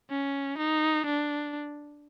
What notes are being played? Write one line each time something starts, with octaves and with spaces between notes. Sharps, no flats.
C#4
D#4
D4